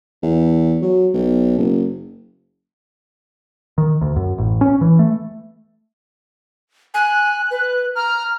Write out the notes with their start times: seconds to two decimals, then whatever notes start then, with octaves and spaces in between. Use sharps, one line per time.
0.23 E2
0.82 F#3
1.14 B1
1.58 F#1
3.78 D#3
4.01 D2
4.16 F#2
4.38 A1
4.61 C#4
4.81 E3
4.99 A3
6.94 G#5 F#6
7.51 B4
7.95 A#5 F6